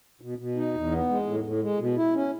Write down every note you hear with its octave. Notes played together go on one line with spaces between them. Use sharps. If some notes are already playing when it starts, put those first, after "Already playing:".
B2
B2
D#4
E2
B3
G#3
A2
A2
G#3
B2
E4
C#4